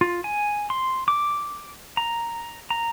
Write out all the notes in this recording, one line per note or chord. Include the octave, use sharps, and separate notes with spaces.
F4
G#5
C6
D6
A#5
A#5